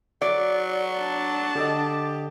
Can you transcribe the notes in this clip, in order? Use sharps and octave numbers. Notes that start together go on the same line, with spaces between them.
F#3 D5
D4 A5
D3 G4 A4 D#5